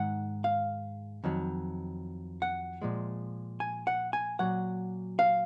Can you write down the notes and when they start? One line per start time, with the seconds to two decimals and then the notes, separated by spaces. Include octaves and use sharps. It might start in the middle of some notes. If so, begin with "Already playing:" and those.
Already playing: G#2 D#3 G#3 F#5
0.44 F5
1.24 F2 D#3 F#3
2.42 F#5
2.82 A#2 F3 G#3
3.60 G#5
3.87 F#5
4.13 G#5
4.39 A#2 F#3 F#5
5.19 F5